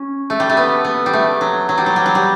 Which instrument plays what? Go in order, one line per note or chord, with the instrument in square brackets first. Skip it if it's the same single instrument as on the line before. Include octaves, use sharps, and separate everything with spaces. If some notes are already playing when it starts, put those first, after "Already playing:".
Already playing: [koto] C#4
A3
G3
A3
B3
B3
G3
A3
F#3
F#3
G3
F#3
G3
F#3
G3